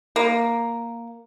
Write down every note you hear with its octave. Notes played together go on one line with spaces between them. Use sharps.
A#3